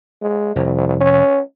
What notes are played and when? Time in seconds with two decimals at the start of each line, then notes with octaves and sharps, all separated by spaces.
0.22 G#3
0.56 F1 C2
1.01 C#4